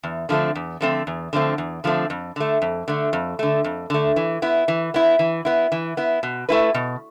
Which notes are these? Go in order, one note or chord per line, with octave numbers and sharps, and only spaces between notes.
E2
D3 F3 A3 C4
E2
D3 F3 A3 C4
E2
D3 F3 A3 C4
E2
D3 F3 A3 C4
F2
D3 A3
F2
D3 A3
F2
D3 A3
F2
D3 A3
E3
B3 E4
E3
B3 E4
E3
B3 E4
E3
B3 E4
B2
A3 E4 B4
B2